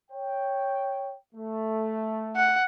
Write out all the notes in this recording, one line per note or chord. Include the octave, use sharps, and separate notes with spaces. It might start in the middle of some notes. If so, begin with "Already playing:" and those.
C#5 G5
A3
F#5